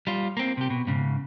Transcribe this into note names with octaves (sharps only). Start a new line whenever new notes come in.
G3 F4
A#3 C4
C3 G4
B2
G#2 C#3